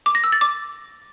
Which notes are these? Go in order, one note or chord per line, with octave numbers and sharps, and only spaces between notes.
D6
A#6
E6
A6
D6